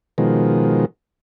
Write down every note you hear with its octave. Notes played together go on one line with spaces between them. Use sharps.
B2 D#3 F3 G#3